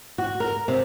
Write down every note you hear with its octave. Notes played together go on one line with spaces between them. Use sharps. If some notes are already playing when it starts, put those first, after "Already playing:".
F#4
A#4
C3